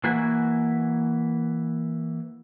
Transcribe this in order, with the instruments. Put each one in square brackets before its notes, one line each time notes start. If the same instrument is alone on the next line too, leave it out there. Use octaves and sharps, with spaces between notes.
[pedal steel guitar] E3 A#3 F#4 B4 G#5